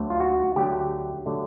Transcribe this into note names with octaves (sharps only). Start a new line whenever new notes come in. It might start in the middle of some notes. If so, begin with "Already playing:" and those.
Already playing: D2 D3 F#3 A3
F4
F#4
D2 D3 F#3 A3 G4
D3 F#3 A3